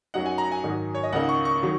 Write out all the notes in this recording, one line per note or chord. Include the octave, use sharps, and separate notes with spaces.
F#2 F#3 D#4 F#5
G#5
A#5
G#5
G#2 D#3 F#3 D#4
C#5
D#5
C#2 C#3 A#3 D#4 F#5
C#6
C#6
D#3 F#3